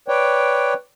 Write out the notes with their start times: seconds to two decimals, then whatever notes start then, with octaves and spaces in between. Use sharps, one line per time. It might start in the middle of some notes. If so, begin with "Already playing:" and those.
0.08 B4 C#5 D5 G5